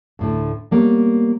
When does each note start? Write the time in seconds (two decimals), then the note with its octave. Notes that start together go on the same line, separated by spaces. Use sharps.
0.19 D2 A2 D3
0.71 G3 A#3 B3 C#5